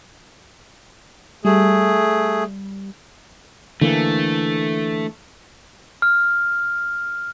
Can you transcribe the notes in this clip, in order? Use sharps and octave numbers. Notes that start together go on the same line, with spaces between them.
G3 A3 G#4
D3 E3 A3 A#3
F6